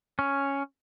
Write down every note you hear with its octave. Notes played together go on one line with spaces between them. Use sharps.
C#4